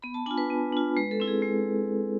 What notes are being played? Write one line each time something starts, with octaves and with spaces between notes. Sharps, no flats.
B3 B5
A5
D4 F4 G#5
B4
B3
D4 F4
G#3 B4
A4
C4 E4
G#4
G#3